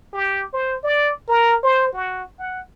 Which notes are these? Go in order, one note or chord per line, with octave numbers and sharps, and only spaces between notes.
G4
C5
D5
A#4
C5
F#4
F#5